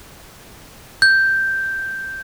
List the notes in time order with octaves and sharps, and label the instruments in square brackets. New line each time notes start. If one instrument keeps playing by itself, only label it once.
[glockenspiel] G6